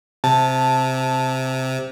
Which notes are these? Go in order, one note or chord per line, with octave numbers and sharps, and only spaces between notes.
C3 A5